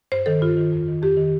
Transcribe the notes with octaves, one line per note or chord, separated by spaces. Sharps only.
G2 C5
D#3 A4
G2 F4
D#3
F2
D#3
F2 G4
D#3